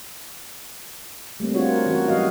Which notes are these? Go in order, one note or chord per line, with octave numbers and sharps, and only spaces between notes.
G3 A3 A#3 C4
C4 D4 F4 F#4 C#5
A#4
E3 C#4 F#4
F#3 G3 F#4 D#5 F5